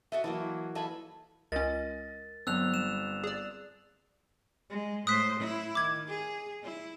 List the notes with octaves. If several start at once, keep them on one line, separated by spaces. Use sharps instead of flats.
F#4 A4 D#5 E5
E3 F#3 A#3 A5
F4 A4 D#5 G#5 A5 B5
C#2 C#4 A#4 D#5 A6
G1 F#3 B3 C4 E6 F#6 F7
G3 E7
G#4 D5
G#3
A2 C5 D#6 F#6 B6
E4
D#3 D6 G#6
G#4
E4